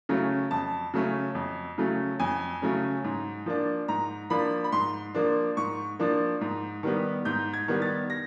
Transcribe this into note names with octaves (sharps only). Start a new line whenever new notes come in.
C#3 F#3 A3 C#4
F2 A5
C#3 F#3 A3 C#4
F2
C#3 F#3 A3 C#4
F2 G#5
C#3 F#3 A3 C#4
G#2
F3 A#3 D4
G#2 A#5
F3 A#3 D4 B5
B5
G#2 C6
F3 A#3 D4
G#2 C#6
F3 A#3 D4
G#2
D#3 G3 B3
G#2 G6
G#6
D#3 G3 B3
A6
A#6